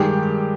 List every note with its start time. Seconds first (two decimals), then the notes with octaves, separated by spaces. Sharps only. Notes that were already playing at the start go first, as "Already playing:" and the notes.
Already playing: G2 D#3 G#3 G4